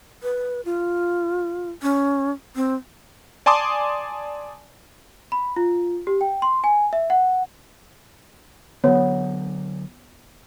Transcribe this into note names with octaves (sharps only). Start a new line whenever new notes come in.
B4
F4
C#4
C4
D5 G#5 A5 C6 D6 D#6
B5
F4
G4
G5
C6
G#5
E5
F#5
D3 F#3 B3 C#5